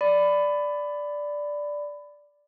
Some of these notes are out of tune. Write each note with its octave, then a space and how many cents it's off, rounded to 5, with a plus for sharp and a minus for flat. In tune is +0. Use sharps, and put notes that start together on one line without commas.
D5 +0 B5 +20